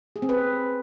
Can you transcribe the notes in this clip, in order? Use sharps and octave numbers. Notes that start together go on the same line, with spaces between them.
G#4
C4
B4